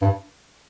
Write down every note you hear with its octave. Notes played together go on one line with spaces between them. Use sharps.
G2